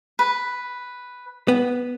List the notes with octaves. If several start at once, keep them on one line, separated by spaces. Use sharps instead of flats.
B4
B3